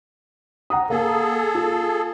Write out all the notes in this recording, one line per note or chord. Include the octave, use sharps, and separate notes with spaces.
F#5 A#5 D#6
A#3 G#4 A4
F4